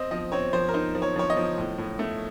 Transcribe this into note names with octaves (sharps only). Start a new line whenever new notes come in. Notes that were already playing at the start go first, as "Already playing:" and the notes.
Already playing: C4 D#5
F3 D#5
C4 C#5
F3 C5
A#4
D#4 C5
F3
C#5
F3 C#5
D#5
F3
A2
A2
A3